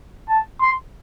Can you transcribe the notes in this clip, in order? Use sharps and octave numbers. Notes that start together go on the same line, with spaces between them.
A5
C6